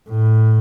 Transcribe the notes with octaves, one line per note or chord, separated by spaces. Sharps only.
A2